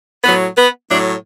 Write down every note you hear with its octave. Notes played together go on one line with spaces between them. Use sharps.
A2 F#3 B3
B3
A2 F#3 A3 D4